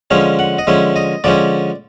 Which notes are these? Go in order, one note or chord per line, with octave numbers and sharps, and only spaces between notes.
D3 F3 G#3 C#4 F5
F#5
D#5
D3 F3 G#3 C#4 E5
D#5
D3 F3 G#3 C#4 D5